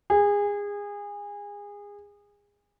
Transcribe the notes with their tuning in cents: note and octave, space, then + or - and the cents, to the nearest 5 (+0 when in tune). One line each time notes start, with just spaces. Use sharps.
G#4 -25